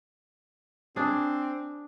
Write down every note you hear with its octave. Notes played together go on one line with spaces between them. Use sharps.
C4 D4 G#4